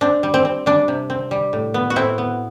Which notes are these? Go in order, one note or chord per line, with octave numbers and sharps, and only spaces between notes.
C4 D4
G3
C4
C4
G3 D4
C3
C4
G3
A2
B3
F#4
A2 C4 E4
B3